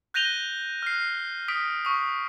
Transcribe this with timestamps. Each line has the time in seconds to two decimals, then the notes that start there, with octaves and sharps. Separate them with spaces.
0.14 F#6 G6 A#6 D#7 F7 G7
0.83 F6 C7
1.48 D#6 B6 D7
1.85 C#6 D#6